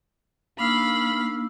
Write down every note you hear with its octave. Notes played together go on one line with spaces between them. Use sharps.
A#3 D4 D#4 F5 B5 E6